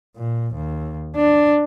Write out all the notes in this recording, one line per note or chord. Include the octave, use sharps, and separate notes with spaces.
A#2
D#2
D4